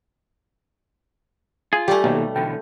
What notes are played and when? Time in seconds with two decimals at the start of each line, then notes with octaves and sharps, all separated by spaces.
1.73 F4 G#4
1.88 G3 A3 G4 D5 G#5
2.04 B1 A#2 D#3
2.36 B2 D3 E3 G5